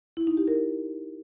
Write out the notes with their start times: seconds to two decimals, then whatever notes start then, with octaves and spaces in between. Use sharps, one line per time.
0.17 E4
0.27 D#4
0.37 G4
0.48 A#4